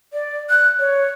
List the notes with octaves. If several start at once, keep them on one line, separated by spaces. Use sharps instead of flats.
D5
F#6
C#5